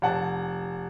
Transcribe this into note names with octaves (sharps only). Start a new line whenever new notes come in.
F1 F#5 A5